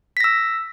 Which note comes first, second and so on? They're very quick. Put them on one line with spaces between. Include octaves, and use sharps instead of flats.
B6 A#6 E6